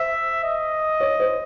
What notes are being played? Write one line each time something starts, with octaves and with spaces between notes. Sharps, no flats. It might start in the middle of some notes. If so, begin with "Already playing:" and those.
Already playing: C5 E5
D#5
C#5
C5